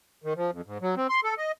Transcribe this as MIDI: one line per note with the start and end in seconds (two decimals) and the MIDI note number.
0.24 0.33 51
0.36 0.51 53
0.52 0.61 41
0.66 0.78 44
0.81 0.95 54
0.97 1.07 60
1.09 1.20 84
1.24 1.34 69
1.38 1.52 75